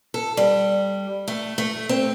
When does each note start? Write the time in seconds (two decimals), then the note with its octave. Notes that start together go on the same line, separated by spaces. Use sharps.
0.14 A4
0.37 G3
1.28 A3
1.58 A3
1.89 C4